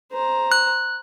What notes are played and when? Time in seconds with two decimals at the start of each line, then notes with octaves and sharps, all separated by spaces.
0.12 C5 A#5
0.52 F#6